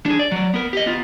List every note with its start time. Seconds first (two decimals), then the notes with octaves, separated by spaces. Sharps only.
0.06 D4 G#4
0.19 D5
0.32 F#3 D5
0.54 B3 A#4
0.73 G4 D#5
0.86 B3 F4